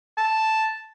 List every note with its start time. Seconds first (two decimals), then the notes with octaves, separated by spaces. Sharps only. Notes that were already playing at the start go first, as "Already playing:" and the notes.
0.18 A5